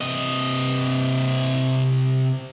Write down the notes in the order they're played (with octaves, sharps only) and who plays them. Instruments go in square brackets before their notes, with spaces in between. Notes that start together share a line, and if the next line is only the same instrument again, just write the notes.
[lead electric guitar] C3 D#5